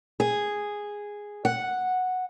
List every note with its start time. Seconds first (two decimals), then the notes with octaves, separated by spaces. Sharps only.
0.20 G#4
1.45 F#5